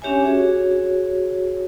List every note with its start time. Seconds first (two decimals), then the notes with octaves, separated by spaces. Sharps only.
0.02 C#4 D4 G4 C#5 E5 G#5
0.24 F#4 G#4 C#5